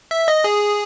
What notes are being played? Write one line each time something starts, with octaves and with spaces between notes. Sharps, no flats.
E5
D#5
G#4